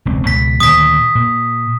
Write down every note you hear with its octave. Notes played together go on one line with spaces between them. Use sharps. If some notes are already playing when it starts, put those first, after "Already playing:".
E1 C#2 C4
C#2 B2 B6
D2 A#2 D#3 D#6 B6
A#2